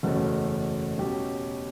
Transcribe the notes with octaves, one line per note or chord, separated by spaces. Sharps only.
F#1 E2 B2 A3 C#4
B2 F#3 C#4 G4